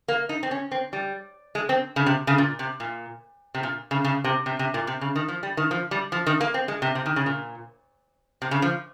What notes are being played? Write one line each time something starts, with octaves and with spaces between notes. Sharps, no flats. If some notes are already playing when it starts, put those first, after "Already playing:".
A#3
D#4
C4
C#4
C4
G3
G#3
C4
C#3
C3
C#3
A#2
C3
A#2
C3
A#2
C#3
C#3
C3
C3
C3
A#2
C3
C#3
D#3
F3
G3
D#3
F3
G3
F3
D#3
A#3
C4
G#3
C3
C3
D#3
C#3
A#2
C3
C#3
F3